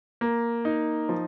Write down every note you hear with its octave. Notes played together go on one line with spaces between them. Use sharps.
A#3
D#4
F3